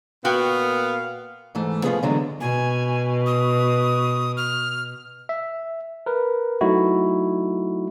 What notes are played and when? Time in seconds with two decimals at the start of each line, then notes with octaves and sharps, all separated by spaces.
0.25 A#2 B3 F#4 F5 G5
1.55 G#2 E3 A3
1.84 F3 A#3 C#4 F4 G#4 B4
2.03 D3 E3 F#3 G#3 B3
2.41 B2 G#5
3.26 D#6
4.37 F6
5.29 E5
6.06 A#4 B4
6.61 F#3 A3 D#4 E4 F#4